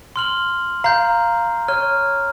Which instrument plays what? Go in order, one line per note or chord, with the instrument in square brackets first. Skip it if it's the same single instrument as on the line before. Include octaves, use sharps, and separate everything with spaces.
[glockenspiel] C6 F6 F#7
[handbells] F5 [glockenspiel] A#5 G6
[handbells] C#5 [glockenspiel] F6